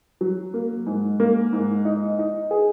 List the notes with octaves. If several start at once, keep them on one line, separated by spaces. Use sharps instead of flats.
F#3
A#3
G#2
A#3
G#2
D#4
D#4
G#4